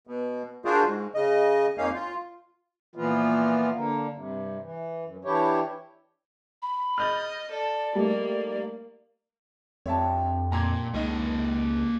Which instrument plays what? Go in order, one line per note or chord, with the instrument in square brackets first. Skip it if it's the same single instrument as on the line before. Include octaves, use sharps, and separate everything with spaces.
[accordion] B2
D4 F4 F#4 G#4 A#4 C5
G#2
C#3 D#5
F2 A#3 C#4 D#4 F5
F4
[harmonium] A#2 E3 F3 B3 F4
D3 A#3
G2 C3
E3
F#2
E3 D4 E4 G4 C#5
[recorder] B5
[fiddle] D#5 [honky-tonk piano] F6 G6 A6
[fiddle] A4 [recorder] D5
[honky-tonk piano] G3 A3 D#4 [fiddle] A#3
[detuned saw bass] F2 [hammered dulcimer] C4 D4 G4 [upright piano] C#5 E5 A5
[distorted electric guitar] A#2 [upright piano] A#5 C6 G#6
[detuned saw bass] C#2 [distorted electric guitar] A#3 C#5 [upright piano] D#4 D#5